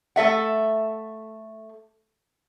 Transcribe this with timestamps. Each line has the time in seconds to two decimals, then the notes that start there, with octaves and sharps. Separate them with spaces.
0.16 A3 A4 E5 F#5